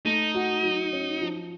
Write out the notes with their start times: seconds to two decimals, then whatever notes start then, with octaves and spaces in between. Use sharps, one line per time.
0.05 A3 D#4
0.35 F#4
0.63 F#3
0.93 C#4
1.21 F3